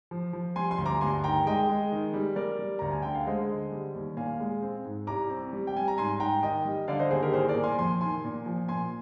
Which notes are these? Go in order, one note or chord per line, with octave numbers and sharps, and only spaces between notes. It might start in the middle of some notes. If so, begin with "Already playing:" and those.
F3
F3
G3 G#5 C6
G#5 C6
D2
A#5 D6
G2 G#5 C6
D#3 G5 A#5
G#3 D#5 G5
G#3
D#3
G3
G3 A#4 D5
G3
D2 A#5
G#5
D3 G5
F5
G#3 C5 D#5
D3
G3
D#2
A#2 F5 G#5
G#3
C4
G#2
C2 A#5 D6
C4
G3
G5
G3 G#5
A#5
G#2 G#5 C6
G#2 G5 A#5
D#3 D#5 G5
G3
D3 D5 F5
C5 D#5
D#2 G#4 C5
G4 A#4
C2 G#4 C5
A#4 D5
A#2
G#5 C6
F2 G#5 C6
D#3 G#5 C6
A#2
F3
A#2 G#5 C6